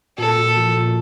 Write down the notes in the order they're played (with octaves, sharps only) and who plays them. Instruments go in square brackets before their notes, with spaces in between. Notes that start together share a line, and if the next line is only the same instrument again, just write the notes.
[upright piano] A#2 [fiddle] A4
[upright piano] A#2
F3
A#2